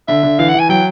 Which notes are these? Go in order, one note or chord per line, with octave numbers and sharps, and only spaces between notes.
D3 E5
D3
E3 F5
F#5
E3 G#5
F#3 G5